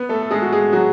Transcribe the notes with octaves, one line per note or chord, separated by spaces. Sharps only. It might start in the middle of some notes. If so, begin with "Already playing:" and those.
Already playing: B3 B4
A3 A4
A4
G#3 G#4
F#4
G#3 G#4
F#3 F#4